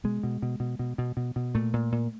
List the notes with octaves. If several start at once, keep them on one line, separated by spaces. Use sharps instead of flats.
B2 G#3
B2
B2
B2
B2
B2
B2
B2
A#2 A3
A#2
A#2